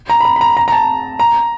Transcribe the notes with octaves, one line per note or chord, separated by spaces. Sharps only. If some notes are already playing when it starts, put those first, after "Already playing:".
A#5
B5
A#5
B5
A#5
A#5
A#5
A5
A#5